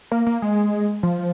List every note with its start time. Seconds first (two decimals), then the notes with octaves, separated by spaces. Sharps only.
0.12 A#3
0.27 A#3
0.42 G#3
1.03 F3